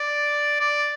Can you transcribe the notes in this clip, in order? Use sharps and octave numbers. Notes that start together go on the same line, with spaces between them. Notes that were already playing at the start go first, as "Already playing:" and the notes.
Already playing: D5
D5